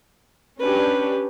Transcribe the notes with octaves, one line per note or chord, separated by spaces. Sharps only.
C#4 D4 G4 B4